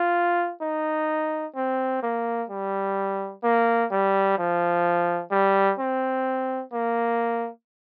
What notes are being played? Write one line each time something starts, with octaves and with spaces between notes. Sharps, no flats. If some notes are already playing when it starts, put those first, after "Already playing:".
Already playing: F4
D#4
C4
A#3
G3
A#3
G3
F3
G3
C4
A#3